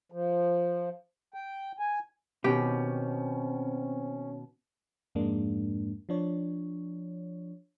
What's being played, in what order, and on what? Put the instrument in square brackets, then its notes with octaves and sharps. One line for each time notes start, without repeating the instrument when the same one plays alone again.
[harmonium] F3
G5
G#5
[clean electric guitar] B2 D#3 [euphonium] C4 [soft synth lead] C#4 [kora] G4
[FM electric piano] F2 G#2 G#3 A#3 D4
F3 D4 C#5